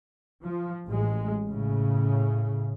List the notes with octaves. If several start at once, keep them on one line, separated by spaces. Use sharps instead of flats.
F3
A1 G#3
A2 C#3